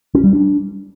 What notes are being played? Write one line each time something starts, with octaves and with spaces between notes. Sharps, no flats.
C#4
G3
D4